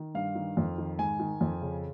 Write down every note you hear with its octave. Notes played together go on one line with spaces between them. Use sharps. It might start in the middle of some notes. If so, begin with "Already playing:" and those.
Already playing: D#3
G2 F5
D#3
F2
D#3
G#2 G#5
D#3
F2
C#3